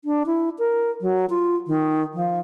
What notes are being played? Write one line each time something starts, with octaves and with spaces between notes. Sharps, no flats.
D4
E4
A#4
F#3
F4
D#3
F3